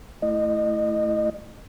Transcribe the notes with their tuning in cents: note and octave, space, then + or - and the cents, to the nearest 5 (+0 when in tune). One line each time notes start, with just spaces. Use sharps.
A3 +0 E4 +0 D#5 -25